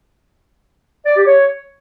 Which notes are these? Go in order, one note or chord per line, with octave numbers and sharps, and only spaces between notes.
D5
G4
C#5